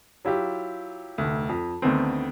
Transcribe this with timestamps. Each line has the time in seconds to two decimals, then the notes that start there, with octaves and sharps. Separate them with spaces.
0.25 F#3 E4 F4 G4
1.18 F1 D2
1.49 F2
1.82 D2 D3 D#3 A3 B3 C4